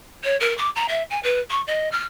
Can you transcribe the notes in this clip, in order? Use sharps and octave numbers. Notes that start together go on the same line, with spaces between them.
C#5
A#4
D6
A#5
E5
G#5
B4
C#6
D#5
F6